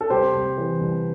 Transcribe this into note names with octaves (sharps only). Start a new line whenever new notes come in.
A4
C2 G4 C5
C2
E3
C2